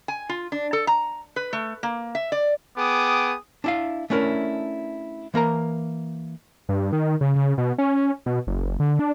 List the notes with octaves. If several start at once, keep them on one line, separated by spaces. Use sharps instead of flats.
G#5
F4
D4
A4
A#5
B4
A3
A#3
E5
D5
B3 G#4 G5 D6 D#6
D4 E4 F5
A3 C#4 D4 E4 A#4
E3 A#3 A#4 A#5
G2
D#3
C#3
C#3
B2
C#4
B2
F#1
D3
D4